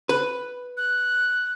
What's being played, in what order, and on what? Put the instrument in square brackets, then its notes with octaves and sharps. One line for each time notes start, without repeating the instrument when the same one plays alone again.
[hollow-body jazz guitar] B4
[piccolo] F#6